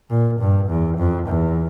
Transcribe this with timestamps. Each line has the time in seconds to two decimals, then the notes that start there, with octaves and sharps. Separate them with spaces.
0.10 A#2
0.40 G2
0.69 E2
0.98 F2
1.28 E2